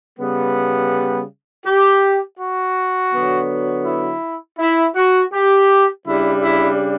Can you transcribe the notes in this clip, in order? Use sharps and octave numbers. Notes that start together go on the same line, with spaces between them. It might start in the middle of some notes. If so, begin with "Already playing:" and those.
C#3 G3 B3
G4
F#4
D3 F#3 B3
E4
E4
F#4
G4
C#3 G3 D4 E4
E4